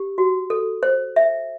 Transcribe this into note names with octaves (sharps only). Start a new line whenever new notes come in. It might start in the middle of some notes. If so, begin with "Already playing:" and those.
Already playing: G4
F#4
A4
C5
E5